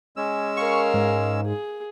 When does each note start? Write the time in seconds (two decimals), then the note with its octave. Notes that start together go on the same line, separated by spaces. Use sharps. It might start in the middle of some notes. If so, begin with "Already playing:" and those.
0.17 G#3 C#4 E6
0.57 A#4 F5 C#6
0.94 G#2
1.46 G#4